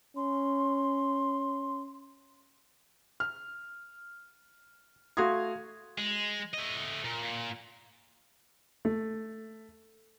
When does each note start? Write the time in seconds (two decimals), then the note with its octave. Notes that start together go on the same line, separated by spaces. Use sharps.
0.16 C#4 C6
3.20 F6
5.17 A3 F#4 F5 C6 D#6 G#6
5.98 G#3
6.54 A3 D#5
7.05 A#2
7.23 A#2
8.85 A3